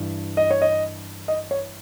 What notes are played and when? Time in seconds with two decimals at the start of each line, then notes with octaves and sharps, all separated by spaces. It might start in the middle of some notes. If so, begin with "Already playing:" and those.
Already playing: G2 E3
0.37 D#5
0.51 C#5
0.62 D#5
1.28 D#5
1.51 C#5